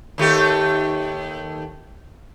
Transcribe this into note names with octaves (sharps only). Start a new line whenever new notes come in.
D#2 A3 G4